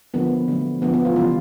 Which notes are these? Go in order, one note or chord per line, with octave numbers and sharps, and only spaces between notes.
D3 F3 A#3 B3
D3 F#3 A3
D3 F3 A3 B3
B3
F4
C#3 E3 G3 F4